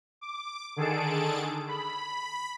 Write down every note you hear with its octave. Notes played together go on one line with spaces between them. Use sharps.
D6
D3 D#3 G#4 A4 A5 D7
B5